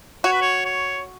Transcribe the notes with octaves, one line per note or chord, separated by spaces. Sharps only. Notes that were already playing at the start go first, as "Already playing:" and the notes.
F#4 C#5
B4
C#5
C#5